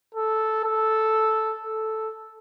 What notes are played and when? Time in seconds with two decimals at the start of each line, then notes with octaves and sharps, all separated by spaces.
0.15 A4
0.64 A4
1.65 A4